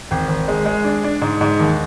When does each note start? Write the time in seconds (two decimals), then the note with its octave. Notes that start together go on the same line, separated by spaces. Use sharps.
0.11 G#1
0.28 G#1
0.48 G#3
0.66 G#3
0.84 D4
1.04 D4
1.22 G#2
1.41 G#2
1.60 D#2